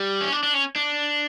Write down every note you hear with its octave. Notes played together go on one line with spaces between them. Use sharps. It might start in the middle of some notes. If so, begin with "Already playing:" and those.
Already playing: G3
C#4
D4
D4
C#4
D4